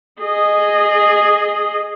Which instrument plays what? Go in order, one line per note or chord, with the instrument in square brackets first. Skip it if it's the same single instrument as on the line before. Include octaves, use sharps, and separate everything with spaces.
[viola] G#4 D#5